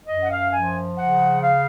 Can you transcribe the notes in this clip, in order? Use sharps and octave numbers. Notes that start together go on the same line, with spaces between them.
F#2 D#5
F#5
F5
F3 G#5
C#3 F#5
F5